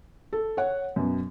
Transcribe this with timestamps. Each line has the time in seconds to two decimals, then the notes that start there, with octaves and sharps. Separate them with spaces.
0.33 A4
0.57 C#5 F#5
0.96 F#2 B2